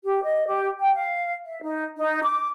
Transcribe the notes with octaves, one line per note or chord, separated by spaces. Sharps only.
G4
D#5
G4
G5
F5
E5
D#4
D#4
D6